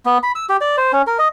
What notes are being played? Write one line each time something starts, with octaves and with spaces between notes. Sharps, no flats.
B3
B5
E6
G4
D5
C5
C#4
A#4
D#5